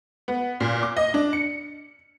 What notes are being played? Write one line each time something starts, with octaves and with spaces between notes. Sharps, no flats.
B3
A#2
D6
D#5
D4
C#7